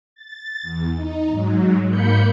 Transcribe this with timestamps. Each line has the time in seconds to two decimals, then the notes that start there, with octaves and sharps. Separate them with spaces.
0.15 A6
0.62 E2
0.95 D#4
1.30 G#2 F#3
1.89 G#2 A#3 B5 G6 C#7